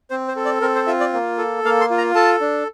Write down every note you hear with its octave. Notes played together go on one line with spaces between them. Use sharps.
C4 C5
C5
A4
D5
C4 A#4
C5
F4 E5
D5
A#3
A4
A#3 F5
C6
F4
A#5
A4 A5
D4